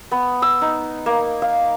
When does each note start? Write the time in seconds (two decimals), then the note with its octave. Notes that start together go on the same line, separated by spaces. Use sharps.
0.11 B3
0.42 E6
0.62 D#4
1.06 A#3
1.42 F5